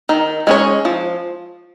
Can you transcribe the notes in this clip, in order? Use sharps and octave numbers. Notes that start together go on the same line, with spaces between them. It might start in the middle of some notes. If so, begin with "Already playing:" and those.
D#3
G#3 C#4 G#4 C#5
F3